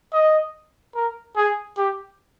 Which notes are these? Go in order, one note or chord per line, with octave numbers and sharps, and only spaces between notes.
D#5
A#4
G#4
G4